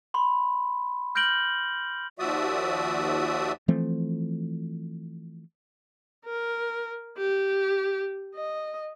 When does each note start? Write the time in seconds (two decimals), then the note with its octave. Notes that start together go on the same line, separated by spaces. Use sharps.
0.14 B5 C6
1.15 F6 G6 A#6 D7 F#7 G7
2.19 D#2 F3 F#4 D5 E5 D#6
3.68 E3 F3 A3 C4
6.25 A#4
7.18 G4
8.35 D#5